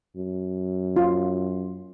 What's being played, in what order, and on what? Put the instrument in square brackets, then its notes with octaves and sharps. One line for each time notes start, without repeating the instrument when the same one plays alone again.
[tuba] F#2
[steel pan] F4